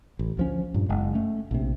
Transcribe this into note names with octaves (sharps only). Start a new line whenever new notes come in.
A1
D2 F3 C#4
G2 A#2
F#1 G#3
A3 C#4
A#1 C3